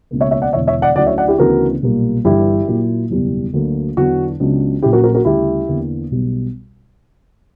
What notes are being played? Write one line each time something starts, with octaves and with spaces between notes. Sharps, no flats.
C#2 B2 A#3
C#5 E5
C#5 E5
D5 F#5
E1 E2 D3 C#5 E5
C#5 E5
D5 F#5
D2 D3 F#3 C#4 E4 D5 F#5
C#5 E5
D5 F#5
E4 G4
D2 C#3 E3 B3 D4 F#4 A#4
B1 A#2 G3 A#3
G1 G2 E3 E4 G4
A#2 F#3 A#3 E4
F#1 E2 B2 G3
D2 D3 F#3 A#3
E2 D3 F#3 B3 F#4
C#2 C#3 F#3 B3 D4
A#1 A#2 F#3 C#4 E4 G4
F#4 A#4
F#4 A#4
F#4 A#4
D2 C#3 G3 E4 G4
E2 D3 A#3
B1 B2 G3